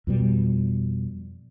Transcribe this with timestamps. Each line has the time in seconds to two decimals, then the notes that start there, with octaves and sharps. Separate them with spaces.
0.07 F2 B2 G3